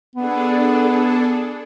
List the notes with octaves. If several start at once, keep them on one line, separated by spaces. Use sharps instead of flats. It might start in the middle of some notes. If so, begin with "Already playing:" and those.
B3 D4 G#4 A4